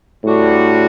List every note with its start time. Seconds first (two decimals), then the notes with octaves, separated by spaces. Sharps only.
0.24 A2 D3 G3 D4 F#4